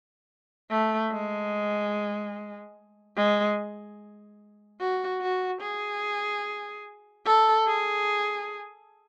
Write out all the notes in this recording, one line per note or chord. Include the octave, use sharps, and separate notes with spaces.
A3
G#3
G#3
F#4
F#4
G#4
A4
G#4